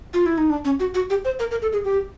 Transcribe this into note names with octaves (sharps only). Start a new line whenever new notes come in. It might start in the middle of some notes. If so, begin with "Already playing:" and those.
F4
E4
D#4
D4
C#4
F#4
F#4
G4
C5
A#4
A#4
A4
G#4
G4